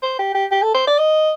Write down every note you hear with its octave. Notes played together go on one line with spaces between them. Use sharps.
C5
G4
G4
G4
A4
C5
D5
D#5